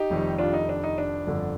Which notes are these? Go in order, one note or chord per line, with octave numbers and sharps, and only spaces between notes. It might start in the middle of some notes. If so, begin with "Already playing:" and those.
Already playing: D#4 G4
F1 F2 D#3 G3
D4 F4
D#4
D4
D#4
D4
G1 F2 D3